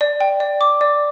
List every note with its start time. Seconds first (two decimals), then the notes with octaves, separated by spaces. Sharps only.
0.01 D5
0.20 G5
0.40 D5
0.61 D6
0.81 D5